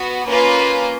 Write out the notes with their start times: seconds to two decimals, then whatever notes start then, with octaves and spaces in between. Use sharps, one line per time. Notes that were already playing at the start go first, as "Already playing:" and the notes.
Already playing: B3 F#4
0.26 A#3 C#4 F4 B4